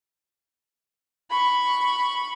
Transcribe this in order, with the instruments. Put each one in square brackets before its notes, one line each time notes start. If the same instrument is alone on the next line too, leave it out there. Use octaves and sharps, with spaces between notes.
[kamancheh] B5 C#6